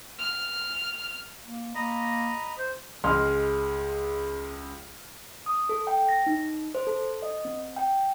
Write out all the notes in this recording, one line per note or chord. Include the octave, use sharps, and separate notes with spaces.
F6
A#3
A#3 D#5 A#5 B5
C5
C#2 G#3 C6 F6
D#6
A4
G5
A#6
D#4
C5
A4
D#5
C4
G5